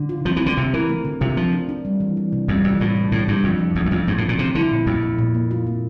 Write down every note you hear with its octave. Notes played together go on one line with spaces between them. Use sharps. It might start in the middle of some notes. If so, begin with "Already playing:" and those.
Already playing: D3
F4
F3 C4
E3
D3 C4
C3 G4
E3 A#4
A3
D3
C3 F4
F3 C4
D4
D4
G3
E3
E3
C3
F2 G3
F2 E3
A2 F4
A3
A2 D3
G2 D3
F2 F3
F3
E2 F3
E2
F2 F4
G2 A3
A2
C4
A#2
C3 C4
D3 E4
A#2
F2 A#2
A3
A#2
A#3
F4
A#3